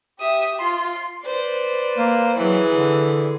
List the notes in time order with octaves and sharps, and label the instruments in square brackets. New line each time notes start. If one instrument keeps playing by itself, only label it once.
[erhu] G4 [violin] E5 D#6
[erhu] F4 [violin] C6
[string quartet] B4 C5 D5
[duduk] A#3
[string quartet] E3 G#4 [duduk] F#3
[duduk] D3